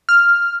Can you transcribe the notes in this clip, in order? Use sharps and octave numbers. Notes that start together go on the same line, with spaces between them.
F6